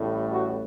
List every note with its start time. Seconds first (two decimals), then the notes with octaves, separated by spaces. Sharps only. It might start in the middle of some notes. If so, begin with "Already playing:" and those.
Already playing: A1 A2 G3
0.30 F#4